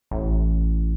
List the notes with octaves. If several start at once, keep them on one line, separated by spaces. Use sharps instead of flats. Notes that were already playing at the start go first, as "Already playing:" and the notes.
A1